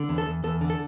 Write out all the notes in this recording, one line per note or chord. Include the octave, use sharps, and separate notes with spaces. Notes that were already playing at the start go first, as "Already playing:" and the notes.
Already playing: D3
E2
A4
E2
E2 A4
D3
A4